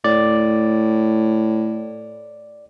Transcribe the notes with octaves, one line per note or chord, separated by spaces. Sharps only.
A2 D5